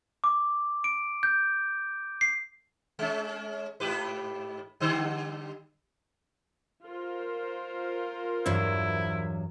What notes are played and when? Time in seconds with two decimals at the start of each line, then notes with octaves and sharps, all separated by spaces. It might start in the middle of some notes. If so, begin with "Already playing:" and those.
0.24 D6
0.84 D7
1.23 G6
2.21 C7
2.99 G#3 C#4
3.80 G#2 G4 B4
4.80 D3 G3
6.84 F4 A#4 C5
8.46 E2 G2 F#3 E4